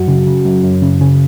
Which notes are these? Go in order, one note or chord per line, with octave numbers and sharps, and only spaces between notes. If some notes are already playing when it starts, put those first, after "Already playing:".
Already playing: F#2 F#4
C#3
C#3
F#2
F#2
C#3
C#3